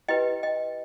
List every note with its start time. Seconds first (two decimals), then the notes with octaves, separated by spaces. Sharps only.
0.08 E4 G4 B4 D#5 G5
0.43 D#5 G5